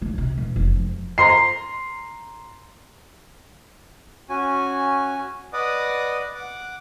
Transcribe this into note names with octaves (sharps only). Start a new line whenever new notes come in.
D3
C3
D#1
F1
F2
A#5 C6 C7
C#4 F#4 G#5
B4 D5 D#5 F#5 D6 D#6
F#5 D6